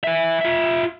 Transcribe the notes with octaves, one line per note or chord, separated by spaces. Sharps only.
B4 E5
F4 E5